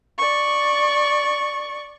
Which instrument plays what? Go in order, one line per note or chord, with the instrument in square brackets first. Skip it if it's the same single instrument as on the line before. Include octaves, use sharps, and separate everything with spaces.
[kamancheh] D5 C#6